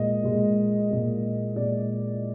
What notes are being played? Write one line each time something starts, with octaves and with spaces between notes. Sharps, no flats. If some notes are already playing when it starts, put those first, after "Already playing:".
Already playing: A#2 G#3 D#5
A#2 G#3
A#2 G#3
A#2 G#3 D5